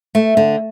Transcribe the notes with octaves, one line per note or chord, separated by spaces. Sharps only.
A3
D3